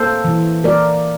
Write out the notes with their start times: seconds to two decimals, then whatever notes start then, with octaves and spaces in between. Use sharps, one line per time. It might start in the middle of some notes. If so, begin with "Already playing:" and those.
Already playing: A#3 A4 C5
0.25 E3
0.64 A#3 A#4 D5